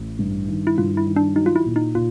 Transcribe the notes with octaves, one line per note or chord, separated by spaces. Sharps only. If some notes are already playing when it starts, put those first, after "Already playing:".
Already playing: A1
G2
D#3
E4
G2 F4
E4
D#3
D4
F#3 D#4
F4
E4
A#2
D#4
A#2 F4